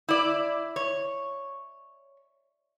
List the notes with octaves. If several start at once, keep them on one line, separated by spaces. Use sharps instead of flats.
E4 D5
C#5